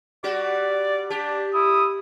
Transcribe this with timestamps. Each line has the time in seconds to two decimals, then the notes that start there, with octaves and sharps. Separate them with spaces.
0.24 G3 F#4 D5
1.10 D4 G4
1.54 E4 D#6